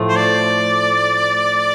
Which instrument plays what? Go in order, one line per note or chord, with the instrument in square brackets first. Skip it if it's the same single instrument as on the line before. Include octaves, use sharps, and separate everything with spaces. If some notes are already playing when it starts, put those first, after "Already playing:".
Already playing: [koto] A2 F3 A3
[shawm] C5
D5